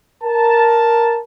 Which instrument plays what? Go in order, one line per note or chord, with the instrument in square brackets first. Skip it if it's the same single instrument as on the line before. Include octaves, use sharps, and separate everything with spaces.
[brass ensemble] A#4 A5